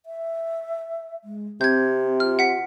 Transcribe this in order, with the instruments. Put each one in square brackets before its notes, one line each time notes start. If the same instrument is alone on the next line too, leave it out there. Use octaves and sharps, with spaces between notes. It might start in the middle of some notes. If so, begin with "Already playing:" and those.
[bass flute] E5
G#3
[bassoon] C3 [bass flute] C4 [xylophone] G6 G#6
[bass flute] F4 [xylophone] F6
[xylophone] F#5 B6